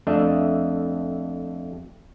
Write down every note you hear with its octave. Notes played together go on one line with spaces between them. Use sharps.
F2 A3 D4 D#5 E5